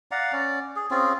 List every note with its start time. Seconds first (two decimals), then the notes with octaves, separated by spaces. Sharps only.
0.11 D5 F5 F#5 A#5
0.32 C#4 D5
0.76 G#4
0.91 C4 C#4 F4 G#4